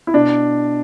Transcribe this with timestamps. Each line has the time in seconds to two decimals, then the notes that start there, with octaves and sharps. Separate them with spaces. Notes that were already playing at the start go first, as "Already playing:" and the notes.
0.07 E4
0.14 B2 D4